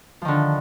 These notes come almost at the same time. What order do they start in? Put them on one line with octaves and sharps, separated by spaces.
F3 D#3 D3